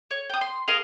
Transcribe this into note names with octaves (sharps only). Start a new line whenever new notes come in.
C#5
G5 D#6
C6
G#4 A#4 D#5 F5